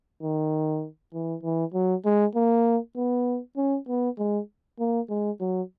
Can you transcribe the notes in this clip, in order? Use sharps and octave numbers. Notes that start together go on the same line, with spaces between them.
D#3
E3
E3
F#3
G#3
A#3
B3
C#4
B3
G#3
A#3
G#3
F#3